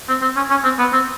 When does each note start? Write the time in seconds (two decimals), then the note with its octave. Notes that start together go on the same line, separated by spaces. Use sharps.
0.08 C4
0.21 C4
0.36 C#4
0.50 C#4
0.64 C4
0.79 B3
0.93 C4